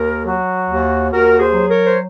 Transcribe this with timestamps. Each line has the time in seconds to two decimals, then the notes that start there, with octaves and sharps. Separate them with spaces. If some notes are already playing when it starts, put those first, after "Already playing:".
Already playing: D#2 A#4
0.25 F#3 F#4
0.69 D#2
1.11 D#2 F#4 A#4
1.39 G#4 C5
1.53 F#3
1.68 A#4 C#5
1.86 C5